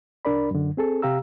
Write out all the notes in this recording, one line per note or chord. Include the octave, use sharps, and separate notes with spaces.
C2 D4 A#4 D5 B5
F#2 D3
C4 G#4 A4
C3 G4 F5 A#5 E6